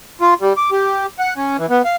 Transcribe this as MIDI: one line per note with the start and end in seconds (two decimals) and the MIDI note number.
0.21 0.34 65
0.41 0.53 55
0.57 0.70 86
0.71 1.06 67
1.19 1.34 78
1.37 1.57 61
1.58 1.66 52
1.70 1.82 59
1.85 1.96 77